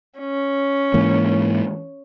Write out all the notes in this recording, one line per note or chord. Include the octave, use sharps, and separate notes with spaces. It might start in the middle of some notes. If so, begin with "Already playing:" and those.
C#4
G#2 E3 A#3